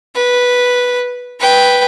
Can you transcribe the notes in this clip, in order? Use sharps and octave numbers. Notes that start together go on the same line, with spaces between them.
B4
B4 G5